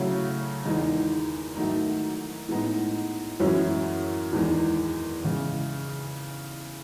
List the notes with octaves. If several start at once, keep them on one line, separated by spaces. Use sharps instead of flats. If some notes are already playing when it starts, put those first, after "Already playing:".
Already playing: C#3 F#3 A3 C#4 E4
E2 D#3 G#3 D#4
G#2 D#3 F#3 A3 D#4
A2 G#3 B3 D#4
F#2 E3 G#3 C#4 E4
E2 D#3 G#3
C#3 E3 G#3